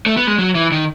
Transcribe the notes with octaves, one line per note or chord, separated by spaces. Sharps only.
A3
B3
G#3
F#3
E3
D#3